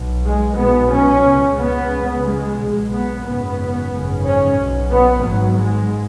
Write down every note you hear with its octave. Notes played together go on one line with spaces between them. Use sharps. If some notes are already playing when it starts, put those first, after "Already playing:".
Already playing: B1 B2
G#3
B1 B2 B3
C#4
C#2 C#3
B3
C#2 C#3
G#3
B1 B2
B3
G#1 F#2 C#3 B3
G#1 F#2 C#3
C#4
B1 B2
B3
G#1 G#2 F#3
G#3